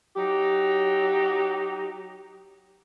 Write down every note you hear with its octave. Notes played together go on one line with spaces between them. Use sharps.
F#3 D#4 G4